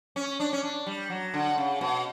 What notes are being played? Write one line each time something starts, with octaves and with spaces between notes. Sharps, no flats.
C#4
D4
C#4
D4
G3
F#3
D3
C#3
B2